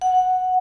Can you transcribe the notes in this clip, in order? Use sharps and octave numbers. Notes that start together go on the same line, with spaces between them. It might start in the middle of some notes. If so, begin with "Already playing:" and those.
F#5